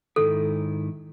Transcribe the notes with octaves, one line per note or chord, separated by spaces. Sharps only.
G#2 D#3 E4 A4